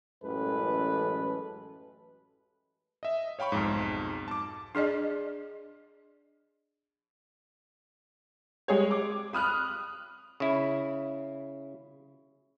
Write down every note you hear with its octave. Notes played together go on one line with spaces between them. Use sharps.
A1 F#2 E3 G#3 A4 B4
D#5 E5
C#5 F5 G5 B5 C#6
B1 F2 G#2
A5 D6
D4 G#4 D5 D#5
G3 G#3 G#4 C#5
D6
B5 D#6 F6 F#6
C#3 E4